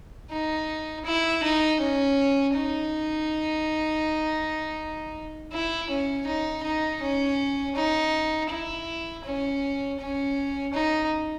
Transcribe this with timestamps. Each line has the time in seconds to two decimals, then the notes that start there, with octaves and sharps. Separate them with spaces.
0.31 D#4
1.06 E4
1.43 D#4
1.80 C#4
2.55 D#4
5.52 E4
5.90 C#4
6.26 D#4
6.63 D#4
7.01 C#4
7.76 D#4
8.50 E4
9.24 C#4
9.99 C#4
10.73 D#4